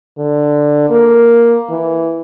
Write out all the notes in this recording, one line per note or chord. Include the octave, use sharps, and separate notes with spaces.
D3
A#3
E3